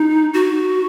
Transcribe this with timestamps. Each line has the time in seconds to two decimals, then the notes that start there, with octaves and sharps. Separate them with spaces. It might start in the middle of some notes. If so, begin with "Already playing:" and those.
Already playing: D#4
0.34 F#4